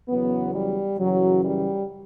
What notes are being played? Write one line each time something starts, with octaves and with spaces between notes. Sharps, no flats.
E2 C#3 F#3 B3
G3
F#2 C#3 E3 F#3
G3